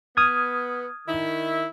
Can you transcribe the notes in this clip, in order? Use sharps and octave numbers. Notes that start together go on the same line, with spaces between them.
B3 D#6 F6 G#6
D#3 E4